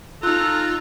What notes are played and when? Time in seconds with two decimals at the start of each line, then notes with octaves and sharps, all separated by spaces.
0.23 D#4 F4 A4 A#5 F6 F#6